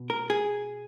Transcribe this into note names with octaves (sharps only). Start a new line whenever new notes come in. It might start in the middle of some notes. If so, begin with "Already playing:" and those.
Already playing: B2
A#4
G#4